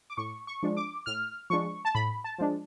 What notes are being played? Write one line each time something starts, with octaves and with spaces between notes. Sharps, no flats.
D6
A2 C#6
C#6
F3 G#3 D4
D6
A2 F6
F3 G#3 D4 C#6
A5
A2 B5
A5
F3 G#3 D4